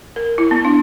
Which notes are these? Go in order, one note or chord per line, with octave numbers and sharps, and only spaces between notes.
A#4
E4
B3
D4